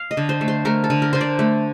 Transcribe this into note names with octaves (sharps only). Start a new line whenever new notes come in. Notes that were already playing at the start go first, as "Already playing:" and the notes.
Already playing: F5
D#5
D3
C5
A3
C5
A3 A#4
A4
D3
A#4
D3 C5
D5
A3